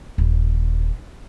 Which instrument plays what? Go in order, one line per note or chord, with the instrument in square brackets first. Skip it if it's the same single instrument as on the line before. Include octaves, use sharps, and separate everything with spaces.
[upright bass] D#1